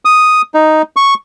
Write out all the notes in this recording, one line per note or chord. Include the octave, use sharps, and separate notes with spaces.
D#6
D#4
C#6